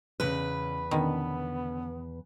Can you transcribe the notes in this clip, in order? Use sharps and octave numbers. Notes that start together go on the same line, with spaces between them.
E2 C#3 C#4 B4 F#6
B2 D3 D#3 B3 C#4